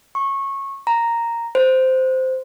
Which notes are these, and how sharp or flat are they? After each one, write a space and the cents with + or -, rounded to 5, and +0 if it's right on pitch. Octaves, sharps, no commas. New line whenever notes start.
C#6 -20
A#5 -5
C5 -10